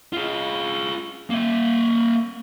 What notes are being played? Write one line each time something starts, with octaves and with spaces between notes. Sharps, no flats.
F4 G#4
A#3 E5